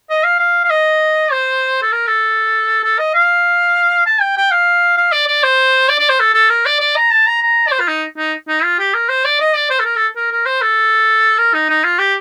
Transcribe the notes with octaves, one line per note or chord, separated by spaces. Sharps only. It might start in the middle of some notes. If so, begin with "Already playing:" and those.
D#5
F5
F5
F5
D#5
C5
A4
A#4
A4
A4
D#5
F5
A5
G5
G5
F5
F5
D5
D5
C5
D5
D5
C5
A4
A4
A#4
D5
D5
A#5
A5
A#5
A#5
D5
C5
F4
D#4
D#4
D#4
F4
G4
A#4
C5
D5
D#5
D5
C5
A4
A#4
A4
A#4
A#4
C5
A4
A#4
D#4
D#4
F4
G4